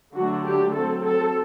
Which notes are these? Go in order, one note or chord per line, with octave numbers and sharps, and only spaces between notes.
D3 F#3 A3 D4 F#4
G4
F#3 C4 A4
A4